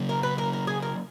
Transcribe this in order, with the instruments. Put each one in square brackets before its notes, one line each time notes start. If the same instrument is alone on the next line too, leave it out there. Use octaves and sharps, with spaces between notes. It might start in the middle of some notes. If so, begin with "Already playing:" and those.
Already playing: [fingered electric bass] C#3 F#3 A#3
[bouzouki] A#4
B4
A#4
A#4
G#4
A#4